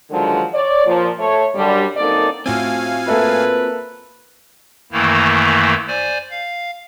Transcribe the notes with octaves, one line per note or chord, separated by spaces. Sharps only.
D3 D#3 F3 F#3 G#3
C#5 D5
A#2 F3
A3 C#5
F#2 D3 G3
F#2 A#3 C4 D#4 A4 D5
A2 C4 F4 F#4 F5 G#5
A#3 A4 B4 E5
F#2 D#3 E3 A3 A#3 E4
C5 D5 G#5
F5